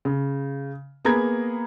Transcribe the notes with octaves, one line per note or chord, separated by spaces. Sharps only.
C#3
A#3 B3 G#4 A#5 B5 G#6